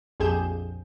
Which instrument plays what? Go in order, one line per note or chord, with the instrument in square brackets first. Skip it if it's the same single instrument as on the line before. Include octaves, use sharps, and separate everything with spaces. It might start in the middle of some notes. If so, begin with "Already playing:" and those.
[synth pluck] A#1 F2 G4 G#4 G6 E7